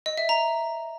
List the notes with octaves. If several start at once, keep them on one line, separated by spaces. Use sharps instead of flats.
D#5
E5
A#5